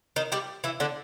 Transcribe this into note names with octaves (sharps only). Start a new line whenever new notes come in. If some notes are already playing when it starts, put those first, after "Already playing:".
D#3 D#4
G3 G4
E3 E4
D3 D4